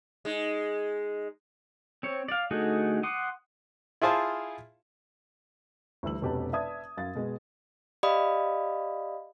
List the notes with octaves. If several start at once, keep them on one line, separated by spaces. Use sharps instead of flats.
G#3 D#4
C4 C#5
D5 F5
D3 A3 D#4 F#4 G#4
F#5 C6 D6 D#6
E4 F4 G#4 C5 F5 A5
D2 E3 G3 E6 F#7
F1 B2 C#4 G4 B4 A5
B4 D5 E5 A5 D#6 G#6
F#2 F5 A6
B2 G#3 B3
G4 D5 D#5 F5 B5 D#6